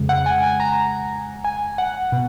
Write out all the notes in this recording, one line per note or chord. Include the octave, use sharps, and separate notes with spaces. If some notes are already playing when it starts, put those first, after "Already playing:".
Already playing: F2 C#3 G#3
F#5
G#5
G#5
A#5
G#5
F#5
B2